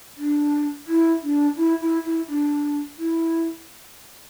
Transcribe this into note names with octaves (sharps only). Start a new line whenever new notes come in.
D4
E4
D4
E4
E4
E4
D4
E4